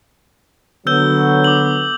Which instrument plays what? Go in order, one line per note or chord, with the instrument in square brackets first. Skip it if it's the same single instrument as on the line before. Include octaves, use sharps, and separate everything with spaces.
[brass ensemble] D3 F#3 B3 [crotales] E6 G6 G7
[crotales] D6 F#7